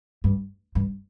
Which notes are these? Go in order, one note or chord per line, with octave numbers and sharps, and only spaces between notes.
G2
G2